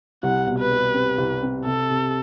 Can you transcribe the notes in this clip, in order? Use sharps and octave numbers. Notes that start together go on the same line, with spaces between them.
C2 F#5
B2
B4
G3
C4
C2
C4
C3 A4
C3